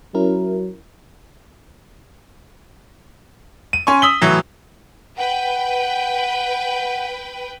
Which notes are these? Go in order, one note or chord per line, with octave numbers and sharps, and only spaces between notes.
F#3 C#4 E4 A#4
D#7
C#4 G#5 C6 C#6
D#6 E6 B6 F#7 G7
A2 E3 F#3
B4 F#5 G5